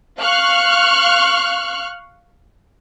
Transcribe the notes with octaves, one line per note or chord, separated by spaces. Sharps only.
F5 C#6 F6 F#6